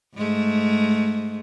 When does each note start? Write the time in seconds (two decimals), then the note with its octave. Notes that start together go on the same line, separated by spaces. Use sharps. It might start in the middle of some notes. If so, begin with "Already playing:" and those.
0.16 G#2 G#3 A3